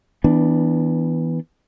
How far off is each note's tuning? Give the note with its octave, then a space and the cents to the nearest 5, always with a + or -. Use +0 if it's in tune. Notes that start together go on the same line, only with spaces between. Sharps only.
E3 -20 B3 +0 D4 +0